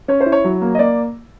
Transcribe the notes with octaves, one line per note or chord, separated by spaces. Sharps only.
C#4 C#5
C5
E4
C#5
F#3
A#3
D#5
A#3 D5